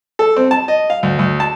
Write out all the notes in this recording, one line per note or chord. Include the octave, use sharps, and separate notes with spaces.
A4
C4
A5
D#5
F5
D2
D2
A5